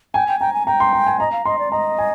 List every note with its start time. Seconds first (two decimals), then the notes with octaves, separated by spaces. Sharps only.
0.14 G5 G#5
0.28 G5
0.40 G5 A#5
0.53 G#5
0.66 G5 A#5
0.80 C6
0.93 A#5
1.07 G#5
1.20 D#5 A#5
1.32 F5
1.45 D#5 C6
1.59 D5
1.72 D#5 A#5
1.99 G#5